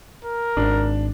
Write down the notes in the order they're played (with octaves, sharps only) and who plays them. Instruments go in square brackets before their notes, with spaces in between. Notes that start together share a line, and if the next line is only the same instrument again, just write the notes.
[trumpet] A#4
[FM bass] G#1 [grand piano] D4